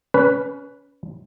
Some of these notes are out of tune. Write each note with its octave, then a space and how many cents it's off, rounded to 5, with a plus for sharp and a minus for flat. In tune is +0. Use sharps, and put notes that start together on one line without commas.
C#4 +25 B4 +0